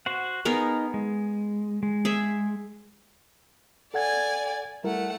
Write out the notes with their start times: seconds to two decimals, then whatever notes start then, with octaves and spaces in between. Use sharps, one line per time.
0.06 F#4 C5 F#5
0.45 B3 D#4 G#4 A#4
0.94 G#3
1.83 G#3
2.05 G#4 E5
3.94 A4 D5 F#5 G#5 G#6
4.84 G3 A3 E4 A#4 F#5